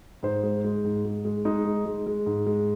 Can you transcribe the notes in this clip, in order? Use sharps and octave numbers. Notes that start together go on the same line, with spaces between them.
G#2 C5
G#3
G#3
G#2
G#3
G#3
G#3 D#4
G#3
G#3
G#3
G#2
G#3